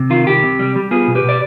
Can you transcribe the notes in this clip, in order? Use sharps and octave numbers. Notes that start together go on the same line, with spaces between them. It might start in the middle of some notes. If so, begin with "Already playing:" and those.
Already playing: C3
D#3 F4
C2 G4
C3
G3
G3
B3 F4 G#4
B2
G4 B4
B2 D5